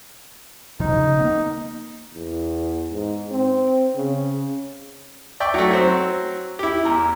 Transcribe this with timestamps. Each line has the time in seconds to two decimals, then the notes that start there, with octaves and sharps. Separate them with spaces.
0.80 D#1 B2 F3 D#4
0.91 C#3
1.20 A#3 B3
2.14 E2
2.91 G#2
3.31 C4
3.95 C#3
5.40 D5 E5 G5 C#6
5.54 F#3 A3
5.71 F#3 C4
6.59 E4 G4
6.85 E2 A#5